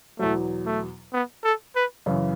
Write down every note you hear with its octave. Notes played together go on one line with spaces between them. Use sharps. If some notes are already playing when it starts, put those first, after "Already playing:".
E2 B2 F#3 A3
A3
B3
A4
B4
F#2 C#3 E3